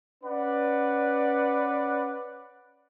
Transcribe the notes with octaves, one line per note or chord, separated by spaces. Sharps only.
C#4 B4 D5 F#5